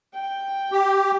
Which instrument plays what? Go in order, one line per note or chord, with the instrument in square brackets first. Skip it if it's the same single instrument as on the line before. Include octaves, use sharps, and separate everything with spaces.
[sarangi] G5
[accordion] G4